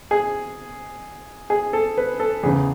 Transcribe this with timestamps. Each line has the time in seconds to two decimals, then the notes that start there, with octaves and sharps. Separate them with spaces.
0.11 G#4
1.50 G#4
1.73 A4
1.97 B4
2.20 A4
2.43 E2 C#3 E3 G#4